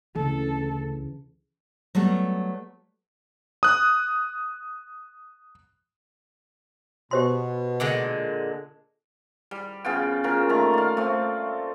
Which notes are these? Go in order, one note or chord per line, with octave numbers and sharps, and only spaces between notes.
D2 C#3 E3 A4
F#3 G3 A3 B3
D#6 F#6
B2 G4 C5 C6
A#2 D3 G#3
G3
C#3 B3 F4 G5
A#2 C#3 A#4
D#3 A3 A#5
D5 F5
A3 C4